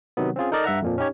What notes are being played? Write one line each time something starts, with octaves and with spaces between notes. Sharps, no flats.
C3 D#3 F#3 B3
C4 C#4 F4 G#4
D#4 A4 A#4 D5 D#5
G2 E5 F#5 A#5
F2 A#2 F3
C#4 D#4 G4 C#5